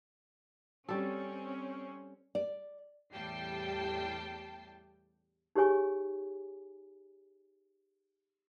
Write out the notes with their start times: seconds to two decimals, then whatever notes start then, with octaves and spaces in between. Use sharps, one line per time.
0.88 G3 C4 C#4 A4
2.35 D5
3.13 E2 A2 G3 G5 A5 C7
5.55 D#4 G4 G#4 C#5 G#5 C#6